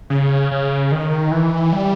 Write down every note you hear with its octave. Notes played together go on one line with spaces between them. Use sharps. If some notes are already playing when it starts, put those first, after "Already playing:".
C#3
C#3
D#3
E3
G3